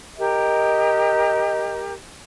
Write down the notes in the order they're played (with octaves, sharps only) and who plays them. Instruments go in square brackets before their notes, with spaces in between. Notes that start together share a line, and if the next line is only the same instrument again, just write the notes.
[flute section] G4 A#4 [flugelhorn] D#5